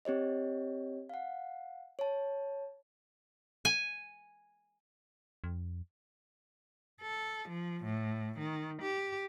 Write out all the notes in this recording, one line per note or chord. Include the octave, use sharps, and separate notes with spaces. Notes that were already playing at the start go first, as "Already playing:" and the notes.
C4 G4 C#5 D#5
F5 F#5
C#5 A5
G#5
F2
A4
F3
A2
D#3
G4